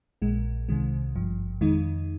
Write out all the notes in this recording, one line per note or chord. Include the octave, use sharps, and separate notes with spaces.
A#1 A#2 G#3
C2 C3 D#3 G#3
G#1 G2 F3
F2 D#3 G#3 D#4